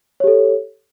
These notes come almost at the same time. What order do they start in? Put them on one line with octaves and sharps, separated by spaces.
C#5 G4 A4